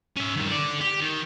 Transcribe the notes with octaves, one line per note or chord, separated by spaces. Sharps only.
C#4 E5
G2 D#3
A4 D5
G4
D#3